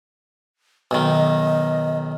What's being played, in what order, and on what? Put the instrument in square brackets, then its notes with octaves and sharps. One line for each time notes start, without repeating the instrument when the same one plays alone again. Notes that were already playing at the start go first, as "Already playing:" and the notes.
[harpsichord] B1 D#3 [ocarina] D#5